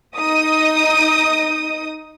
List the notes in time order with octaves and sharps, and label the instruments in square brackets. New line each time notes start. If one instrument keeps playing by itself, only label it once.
[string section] D#4 D#6